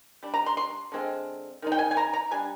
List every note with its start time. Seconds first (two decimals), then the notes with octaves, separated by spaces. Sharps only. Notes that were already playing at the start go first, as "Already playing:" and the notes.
0.23 G3 D4
0.34 A#5
0.46 C6
0.57 C6
0.92 D3 G#3 C4 F4
1.62 D#3 G#3 D#4
1.72 G5
1.79 G#5
1.91 G#5
1.97 A#5
2.13 A#5
2.31 G3 D4 G#5